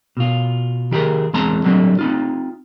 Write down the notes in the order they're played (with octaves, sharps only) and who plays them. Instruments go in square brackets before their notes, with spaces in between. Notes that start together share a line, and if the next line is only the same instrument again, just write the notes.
[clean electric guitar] B2 F4
D#3 G4 G#4 A#4
E2 G#3 C4 A5 A#5
D3 F#3 G3 C4
C4 D#4 F4